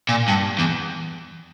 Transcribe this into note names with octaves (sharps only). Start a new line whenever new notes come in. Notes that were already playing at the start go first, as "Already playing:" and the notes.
A#2
G2
E2